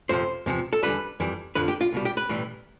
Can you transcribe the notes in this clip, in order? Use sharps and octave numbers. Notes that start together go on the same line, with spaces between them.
F2 C3 F3 C5
E2 C3 F3
A4
E2 D3 G3 B4
F2 E3 G3
F2 D3 F3 B4
G4
F4
C2 B2 G3
G4
B4
B1 A2 E3 G3